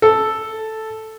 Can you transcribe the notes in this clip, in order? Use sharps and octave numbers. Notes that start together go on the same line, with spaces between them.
A4